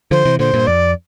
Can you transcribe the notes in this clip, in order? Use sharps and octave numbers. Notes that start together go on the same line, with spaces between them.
D3 F3 C5
C3 E3
A#2 D3 C5
G2 A#2
F2 D5